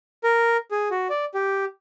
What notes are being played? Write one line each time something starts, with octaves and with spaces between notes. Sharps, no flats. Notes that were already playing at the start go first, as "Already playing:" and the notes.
A#4
G#4
F#4
D5
G4